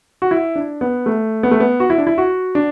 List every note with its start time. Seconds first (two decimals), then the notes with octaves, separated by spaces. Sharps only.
0.22 F#4
0.31 E4
0.56 D4
0.81 B3
1.06 A3
1.43 B3
1.51 A3
1.60 B3
1.80 F#4
1.90 E4
1.98 D4
2.07 E4
2.18 F#4
2.55 D4